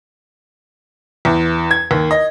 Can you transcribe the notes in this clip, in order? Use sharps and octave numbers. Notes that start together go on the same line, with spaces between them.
E2
G#6
D#2
D#5